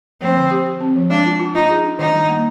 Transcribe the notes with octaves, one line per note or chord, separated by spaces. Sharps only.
F3 C4
D3
G4
G4
C4
F3
G#3 D4
F4
F4
D#4 F4
G#4
D4
D#3 D#4
G3
A#3